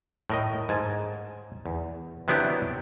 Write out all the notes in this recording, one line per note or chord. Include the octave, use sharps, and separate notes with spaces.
A2 A#4 D#5
G#2 G#5 A5
E2
C3 F#3 B3 D4 E4 G4